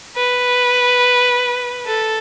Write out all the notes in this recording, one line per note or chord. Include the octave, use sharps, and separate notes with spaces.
B4
A4